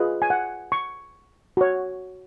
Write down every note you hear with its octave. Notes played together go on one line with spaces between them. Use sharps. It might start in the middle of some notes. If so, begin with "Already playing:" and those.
Already playing: F4 G#4 B4 D#5
G#5
F#5
C#6
F#4 C#5